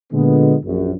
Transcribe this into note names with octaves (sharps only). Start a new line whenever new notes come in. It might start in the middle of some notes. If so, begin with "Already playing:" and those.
A#2 D3 G#3 B3
A#1 F#2